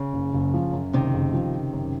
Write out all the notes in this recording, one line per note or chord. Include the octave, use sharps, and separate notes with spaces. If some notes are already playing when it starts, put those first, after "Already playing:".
Already playing: C#3
F#1
F#1
F3
F#2
F#1 C3 D#3
F#1
F3
C#3
F#2